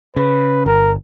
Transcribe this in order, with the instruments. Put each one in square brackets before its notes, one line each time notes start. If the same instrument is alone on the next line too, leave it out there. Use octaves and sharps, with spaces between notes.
[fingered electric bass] C#3 [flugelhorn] B4
[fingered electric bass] G1 [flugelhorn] A#4